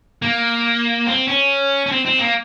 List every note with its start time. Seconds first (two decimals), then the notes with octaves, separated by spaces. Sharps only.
0.22 A#3
1.07 C4
1.28 C#4
1.86 C#4
1.92 C4
2.06 C4
2.19 A#3